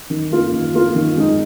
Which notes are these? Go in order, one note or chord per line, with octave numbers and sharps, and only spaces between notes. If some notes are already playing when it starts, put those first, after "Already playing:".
D#3
A#3 F4
D#3
A#3 F4
D#3
G#3 D#4